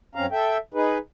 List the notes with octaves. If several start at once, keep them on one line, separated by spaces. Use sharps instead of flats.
F#2 C4 C#4 F5 A#5
A4 E5 G5
D#4 G#4 B4